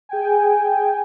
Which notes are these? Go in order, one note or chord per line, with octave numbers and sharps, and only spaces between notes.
G#4 G5 G#5